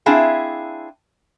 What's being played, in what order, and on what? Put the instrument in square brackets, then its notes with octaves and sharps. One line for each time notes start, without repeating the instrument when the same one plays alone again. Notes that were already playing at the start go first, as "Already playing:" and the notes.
[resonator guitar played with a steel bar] C4 D4 E4 G#4 E5 F5